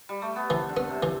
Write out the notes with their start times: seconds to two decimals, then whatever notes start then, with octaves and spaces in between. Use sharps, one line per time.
0.09 G3
0.22 A3
0.36 B3
0.50 E3 C4
0.69 D3
0.77 B3
0.89 C3
1.03 E3